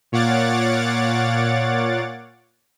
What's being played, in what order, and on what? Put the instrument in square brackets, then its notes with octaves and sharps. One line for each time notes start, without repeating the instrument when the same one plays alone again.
[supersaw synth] A#2 C#5 F5 F#5 D6 A6